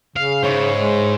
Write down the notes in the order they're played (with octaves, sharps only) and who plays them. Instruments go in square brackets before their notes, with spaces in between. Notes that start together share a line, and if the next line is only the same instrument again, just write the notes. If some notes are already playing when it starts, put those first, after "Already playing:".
[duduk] C#3 [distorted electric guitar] F5
[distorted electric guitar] G#2 [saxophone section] E4 C5 C#5
[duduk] G#3